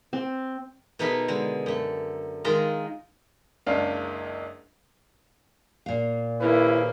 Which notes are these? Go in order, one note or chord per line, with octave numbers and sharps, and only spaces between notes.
C4
B2 A3 D#4 G#4 A#4 B5
D3 G#3
F#2 A3
D#3 G#3 F4 A#4 D#5 A#5
F#1 C#2 C#4 D4 F5
A#2 F5
D#2 C#3 A#3 E4 B4 C5